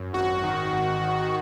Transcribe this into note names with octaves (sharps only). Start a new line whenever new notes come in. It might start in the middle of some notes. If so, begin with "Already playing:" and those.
Already playing: F#2
G#1 F#4
D#3
G#1
D#3